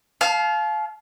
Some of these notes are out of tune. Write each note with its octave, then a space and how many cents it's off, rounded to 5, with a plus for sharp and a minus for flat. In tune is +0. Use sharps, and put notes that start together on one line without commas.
F5 +0 A5 -40